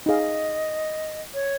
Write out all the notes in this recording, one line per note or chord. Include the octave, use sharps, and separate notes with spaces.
D#4 G#4 D#5 F5
C#5